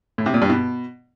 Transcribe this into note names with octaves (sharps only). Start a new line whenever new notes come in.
A2
C3
A#2
G2
B2